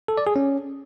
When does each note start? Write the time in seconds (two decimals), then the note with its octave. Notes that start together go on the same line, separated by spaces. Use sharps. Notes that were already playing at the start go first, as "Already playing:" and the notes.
0.08 A4
0.18 D5
0.27 G#4
0.36 C#4